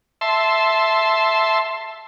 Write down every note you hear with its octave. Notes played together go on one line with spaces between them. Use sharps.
E5 A5 C6